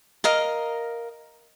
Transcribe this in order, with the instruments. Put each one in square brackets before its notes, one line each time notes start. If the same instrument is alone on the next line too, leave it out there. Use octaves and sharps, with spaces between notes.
[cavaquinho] A#4 D#5 F5